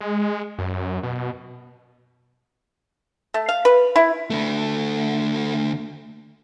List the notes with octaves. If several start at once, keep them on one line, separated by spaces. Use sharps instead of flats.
G#3
F#2
B2
A3
F5
B4
E4
D3 A3